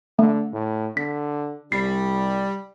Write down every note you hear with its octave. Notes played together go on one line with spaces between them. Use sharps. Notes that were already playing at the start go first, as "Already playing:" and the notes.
D3 A3
A2
D3 B6
C2 G3 C7